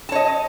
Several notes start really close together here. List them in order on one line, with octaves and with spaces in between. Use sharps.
A5 C#5 D#5